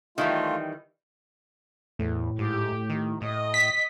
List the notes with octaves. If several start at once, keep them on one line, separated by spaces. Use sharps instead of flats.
D#3 E3 G3 A3 F4
E2 A2
G#2 G4
D#3
A2 D#5
B6